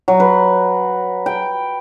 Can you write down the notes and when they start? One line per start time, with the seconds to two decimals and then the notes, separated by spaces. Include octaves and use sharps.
0.08 F#3
0.20 B4
1.26 G5